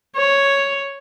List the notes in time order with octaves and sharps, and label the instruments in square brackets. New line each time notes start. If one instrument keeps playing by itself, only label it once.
[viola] C#5